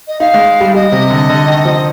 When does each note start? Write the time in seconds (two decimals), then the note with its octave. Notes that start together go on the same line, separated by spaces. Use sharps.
0.08 D#5
0.20 D#4 F5
0.34 G#3
0.60 G3
0.74 G3 D#5
0.92 C3
1.10 D3
1.30 D3
1.47 D#3
1.65 F3